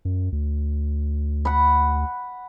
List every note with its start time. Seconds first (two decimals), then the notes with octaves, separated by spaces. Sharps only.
0.05 F#2
0.32 D2
1.45 F#5 B5